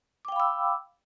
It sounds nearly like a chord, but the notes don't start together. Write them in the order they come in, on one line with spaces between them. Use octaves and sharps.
D6 G5 F5 B5 E6